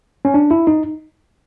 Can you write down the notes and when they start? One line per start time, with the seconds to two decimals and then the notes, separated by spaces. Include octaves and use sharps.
0.25 C#4
0.34 D4
0.51 E4
0.67 D#4